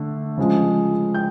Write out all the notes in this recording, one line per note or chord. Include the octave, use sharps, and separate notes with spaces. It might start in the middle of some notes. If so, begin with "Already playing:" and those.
Already playing: D3 A3
C#3 F3 G#3
G5 G6